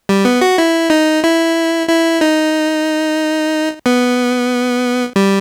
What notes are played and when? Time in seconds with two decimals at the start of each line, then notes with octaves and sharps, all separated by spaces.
0.09 G3
0.25 B3
0.41 F#4
0.58 E4
0.90 D#4
1.24 E4
1.89 E4
2.21 D#4
3.86 B3
5.16 G3